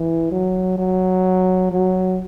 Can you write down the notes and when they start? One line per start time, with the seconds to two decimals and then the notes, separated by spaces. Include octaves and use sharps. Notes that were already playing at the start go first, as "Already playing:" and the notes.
Already playing: E3
0.32 F#3
0.78 F#3
1.71 F#3